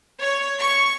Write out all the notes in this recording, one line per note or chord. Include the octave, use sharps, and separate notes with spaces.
C#5
C#6